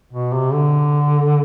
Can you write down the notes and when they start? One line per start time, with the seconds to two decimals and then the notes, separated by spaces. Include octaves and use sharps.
0.13 B2
0.33 C3
0.53 D3